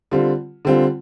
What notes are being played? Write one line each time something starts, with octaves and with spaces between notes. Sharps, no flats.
D3 G3 C4 F4
D3 G3 C4 F4